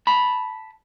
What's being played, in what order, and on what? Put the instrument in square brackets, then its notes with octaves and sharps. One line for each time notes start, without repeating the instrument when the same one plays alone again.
[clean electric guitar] A5 B5